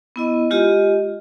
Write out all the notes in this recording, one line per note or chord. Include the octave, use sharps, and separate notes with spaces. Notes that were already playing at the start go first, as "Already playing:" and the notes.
B3 E4 D#5
G#3 F4 G4 D#5